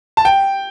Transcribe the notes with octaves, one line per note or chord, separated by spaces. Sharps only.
A5
G5